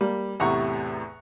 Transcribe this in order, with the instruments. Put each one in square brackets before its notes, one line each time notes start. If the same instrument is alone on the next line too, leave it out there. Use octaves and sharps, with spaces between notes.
[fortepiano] G3 [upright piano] A#3
[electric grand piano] E2 A2 [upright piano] C3 E4 [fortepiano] F#5 A#5 C#6